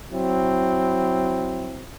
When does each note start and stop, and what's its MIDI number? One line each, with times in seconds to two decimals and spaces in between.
0.12 1.87 54
0.12 1.87 60
0.12 1.87 64